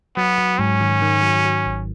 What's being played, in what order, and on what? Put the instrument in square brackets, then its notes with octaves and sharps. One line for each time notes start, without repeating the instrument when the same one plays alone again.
[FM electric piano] F#3 [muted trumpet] B3
[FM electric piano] F#3
[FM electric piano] G#2 [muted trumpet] C#4
[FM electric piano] D#3
D#3
F#3
F#3
G#1